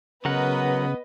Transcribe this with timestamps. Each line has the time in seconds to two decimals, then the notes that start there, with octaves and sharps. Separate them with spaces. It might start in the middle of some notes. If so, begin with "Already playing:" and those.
0.25 C#3 F#3 B3 A#4 B4 D#5 F#5